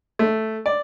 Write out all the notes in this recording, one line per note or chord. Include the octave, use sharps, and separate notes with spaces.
A3
D5